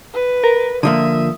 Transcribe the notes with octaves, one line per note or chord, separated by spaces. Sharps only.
B4
A#4
D3 F3 A#3 E5 D#6